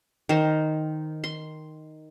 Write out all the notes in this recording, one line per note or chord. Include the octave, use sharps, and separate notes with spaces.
D#3 C5
C6